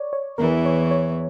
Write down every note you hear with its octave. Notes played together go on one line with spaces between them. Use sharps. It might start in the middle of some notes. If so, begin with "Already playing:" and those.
Already playing: C#5 D5
C#5
E2 E3 A#4
C#5
C#5